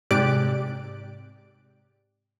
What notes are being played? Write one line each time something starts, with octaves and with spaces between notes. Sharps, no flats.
G#2 C3 G4 D5 F#6 D7